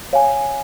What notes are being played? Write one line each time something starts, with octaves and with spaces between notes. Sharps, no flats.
C#5 F5 G#5